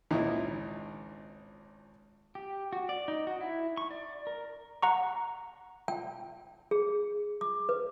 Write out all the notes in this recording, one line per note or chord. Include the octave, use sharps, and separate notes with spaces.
G#1 C#2 A#2 D#4 E4
G4
F#4
D5
D#4
F#4
E4
C#6
D5
A#4
F#5 A#5 C#6
G5
G#4
D6
B4